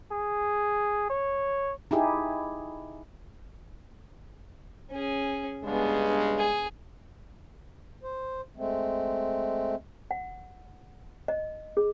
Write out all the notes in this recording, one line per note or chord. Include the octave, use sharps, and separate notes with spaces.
G#4
C#5
D#4 E4 G4 G#4
C#4 G#4
G2 C#3 G#3 B3 D4
G#4
C5
G#3 A3 C4
F#5
D#5
G#4